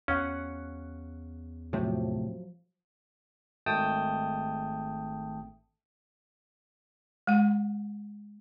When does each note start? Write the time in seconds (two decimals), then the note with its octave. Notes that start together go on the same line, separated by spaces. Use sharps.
0.08 E2 C#4 F5 F#5
1.73 A2 C3 F3 F#3
3.66 G#1 A3 G5 A5 D#6
7.27 G#3 F#5